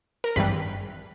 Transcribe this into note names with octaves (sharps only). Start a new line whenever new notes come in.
A#4
G#1 G2 E3 G3 B4